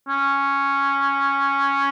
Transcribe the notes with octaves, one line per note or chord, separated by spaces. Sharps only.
C#4